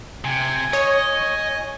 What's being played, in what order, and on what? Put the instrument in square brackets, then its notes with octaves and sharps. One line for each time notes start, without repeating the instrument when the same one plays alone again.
[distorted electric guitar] C3 [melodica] G#5
[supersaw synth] C#5 [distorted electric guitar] D#5